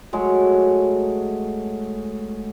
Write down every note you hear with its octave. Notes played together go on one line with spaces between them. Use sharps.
F#3 G#3 A3